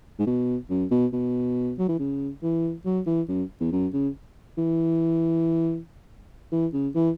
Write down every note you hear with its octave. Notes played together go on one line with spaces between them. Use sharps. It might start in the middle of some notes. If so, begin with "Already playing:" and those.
G#2
B2
F#2
B2
B2
F#3
E3
C#3
E3
F#3
E3
F#2
E2
F#2
C#3
E3
E3
C#3
E3